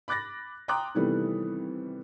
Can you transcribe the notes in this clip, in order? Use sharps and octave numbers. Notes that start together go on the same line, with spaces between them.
B5 D6 F#6 A6 A#6
G5 A#5 C6 D6 D#6 F#6
C3 D#3 E3 G3 A3 B3